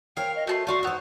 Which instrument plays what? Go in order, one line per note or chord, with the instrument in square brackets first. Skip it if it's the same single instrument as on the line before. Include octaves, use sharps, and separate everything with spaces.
[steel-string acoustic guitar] A#4 C5 C#5 [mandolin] F5 [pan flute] G5
[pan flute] D#5
[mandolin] A3 A5 C6 [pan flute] F#4
[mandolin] A3 F5 C6 [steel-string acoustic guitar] F#4 D5 [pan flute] C#6
[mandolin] B3 E6 [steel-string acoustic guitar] D#4 C5